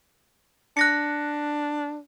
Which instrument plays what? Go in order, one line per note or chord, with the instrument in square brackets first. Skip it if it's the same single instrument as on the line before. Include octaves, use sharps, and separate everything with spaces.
[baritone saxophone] D4 [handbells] F#6 A#6 C#7